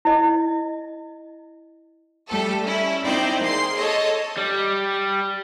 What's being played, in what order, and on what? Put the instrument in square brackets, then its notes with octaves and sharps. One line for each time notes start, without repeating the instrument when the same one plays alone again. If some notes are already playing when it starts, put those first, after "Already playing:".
[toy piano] E4 D#5
[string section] G3 A3 A4
C#4 E4
C4 D#4 E4 C5 D5 G5
A#3 G#4 C6 C7
A4 C#5 D#5
[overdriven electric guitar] G3